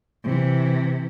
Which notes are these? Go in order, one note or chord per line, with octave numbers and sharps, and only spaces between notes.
C3 E3